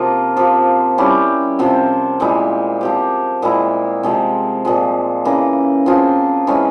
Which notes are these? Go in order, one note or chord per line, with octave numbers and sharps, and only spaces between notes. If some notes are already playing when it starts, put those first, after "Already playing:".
Already playing: C3 F3 A#3 F4
F3 C4 G4
G3 C#4 E4 G4
C3 F3 C4 F4
A#2 G#3 E4 G4
F3 C4 G4
A#2 G#3 E4
C3 F3 G#3 C4
A#2 F3 G#3
C#3 E3 A#3
F3 C4 F4 G#4
E3 G#3 C#4